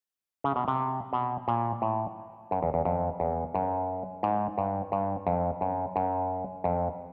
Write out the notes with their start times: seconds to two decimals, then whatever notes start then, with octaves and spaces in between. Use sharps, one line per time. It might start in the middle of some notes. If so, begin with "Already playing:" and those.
0.44 C#3
0.56 B2
0.68 C3
1.13 B2
1.48 A#2
1.82 A2
2.51 F#2
2.63 E2
2.74 E2
2.85 F2
3.20 E2
3.55 F#2
4.23 G#2
4.58 G2
4.92 G2
5.27 F2
5.61 F#2
5.96 F#2
6.64 F2